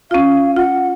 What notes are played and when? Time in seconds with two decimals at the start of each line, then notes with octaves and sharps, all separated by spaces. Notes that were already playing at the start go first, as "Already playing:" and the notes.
0.11 C#4 F4 F5
0.57 F4 F#5